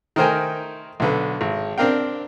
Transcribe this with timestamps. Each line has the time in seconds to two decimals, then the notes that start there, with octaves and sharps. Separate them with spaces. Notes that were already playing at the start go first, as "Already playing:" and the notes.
0.16 D#3 A3 A#4 C5 G5 G#5
1.00 B1 D3 B4
1.41 G#1
1.78 C4 D4 A#4 F5 G5